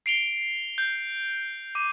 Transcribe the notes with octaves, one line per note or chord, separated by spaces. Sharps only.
C7 D7 F7 G7
G6
D6 D#7